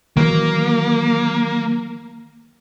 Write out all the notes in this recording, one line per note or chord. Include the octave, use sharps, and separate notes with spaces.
D#3 E3 F#3 A#3